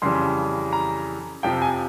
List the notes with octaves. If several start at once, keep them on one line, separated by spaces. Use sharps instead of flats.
F2 C#3 E3 G3 C6
A#5
F2 C3 F3 G5
G#5